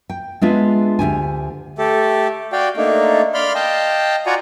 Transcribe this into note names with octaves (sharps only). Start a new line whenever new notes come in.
G5
G#3 B3 D4 F4 G#4 E5
D2 B2 G4 G#5
A3 G4 A4
F#4 D5 F5 G5
A3 A#3 D4 D#4
D5 F5 B5 C6 F6
D#5 F5 G5 A5
F4 F#4 D5 F#5 G#5 A#5